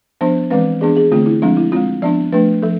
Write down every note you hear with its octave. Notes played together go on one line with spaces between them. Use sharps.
F3 B3 D4 C5
E3 G#3 C4 B4
E3 B3 D4 G#4
G#4
D3 A3 C4 F4
E4
F3 G#3 C4 D4
E4
G#3 C4 F4
F3 B3 D4 D5
F3 A3 D4 B4
F3 A4